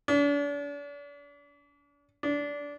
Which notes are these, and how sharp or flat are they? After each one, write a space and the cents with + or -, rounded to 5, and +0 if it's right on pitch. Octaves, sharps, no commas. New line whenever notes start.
D4 -40
D4 -20